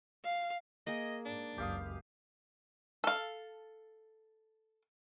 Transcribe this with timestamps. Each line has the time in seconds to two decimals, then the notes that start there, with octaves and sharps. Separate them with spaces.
0.25 F5
0.87 A#3 G#4 D#5
1.25 G#2 D4
1.58 F#1 C#2 F#2 G4 F5 D#6
3.04 A4 F5